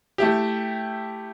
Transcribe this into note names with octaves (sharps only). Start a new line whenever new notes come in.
A3 E4 G4